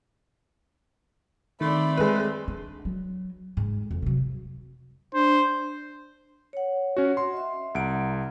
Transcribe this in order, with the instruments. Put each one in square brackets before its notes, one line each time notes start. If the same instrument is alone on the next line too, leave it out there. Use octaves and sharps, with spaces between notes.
[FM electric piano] D#3 [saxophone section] A3 C4 [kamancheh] D5 B5
[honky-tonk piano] G#3 B4
[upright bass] D4
F#3
G#2
F2
C3 F#3
[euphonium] D4 [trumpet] C5
[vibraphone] C#5 F#5
[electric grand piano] C#4 F#4
C6
[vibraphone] D#5 E5
[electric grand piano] C2 D7 [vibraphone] F#5 A#5